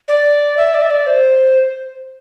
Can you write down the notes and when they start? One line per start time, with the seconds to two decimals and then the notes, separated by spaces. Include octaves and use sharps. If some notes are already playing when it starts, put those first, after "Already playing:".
0.08 D5
0.57 E5
0.74 D5
0.82 E5
0.90 D5
1.07 C5